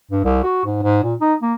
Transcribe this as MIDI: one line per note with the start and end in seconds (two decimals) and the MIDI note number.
0.11 0.24 43
0.24 0.42 36
0.44 0.63 66
0.65 0.78 44
0.83 1.03 44
1.03 1.14 46
1.21 1.34 63
1.42 1.54 58